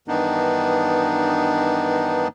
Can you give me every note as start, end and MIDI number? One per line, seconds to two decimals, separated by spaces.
0.08 2.28 43
0.08 2.28 51
0.08 2.28 52
0.08 2.28 59
0.08 2.28 62
0.08 2.28 63